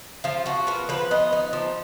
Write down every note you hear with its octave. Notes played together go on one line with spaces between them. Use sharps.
F3 F4
F3 F#4
B3 A#4
F3 B4
B3 D#5
D#4
F3